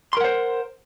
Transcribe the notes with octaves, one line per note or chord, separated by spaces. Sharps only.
A#4 C5 F#5 C6